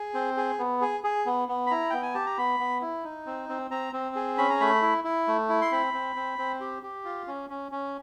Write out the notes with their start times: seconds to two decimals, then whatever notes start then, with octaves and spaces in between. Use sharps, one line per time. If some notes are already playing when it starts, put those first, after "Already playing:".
Already playing: G#4
0.14 C4
0.37 G#4
0.59 B3
0.81 G#4
1.04 G#4
1.26 B3
1.48 B3
1.66 B5
1.71 E4 A#5
1.90 B3 G5
2.02 G#5
2.14 G4 A5
2.26 A#5
2.38 B3 B5
2.60 B3
2.81 E4
3.04 D#4
3.26 C4
3.49 C4
3.71 C4 A#5
3.93 C4
4.15 G#4
4.38 C#4 B5
4.50 A#5
4.60 A3 B5
4.82 E4
5.04 E4
5.27 A3
5.49 E4
5.61 C6
5.72 C4 B5
5.94 C4
6.16 C4
6.38 C4
6.60 G4
6.83 G4
7.05 F4
7.28 C#4
7.50 C#4
7.72 C#4